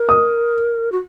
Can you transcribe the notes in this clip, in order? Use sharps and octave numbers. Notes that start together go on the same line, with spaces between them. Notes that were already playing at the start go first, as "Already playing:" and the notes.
Already playing: A#4
D#6
F#4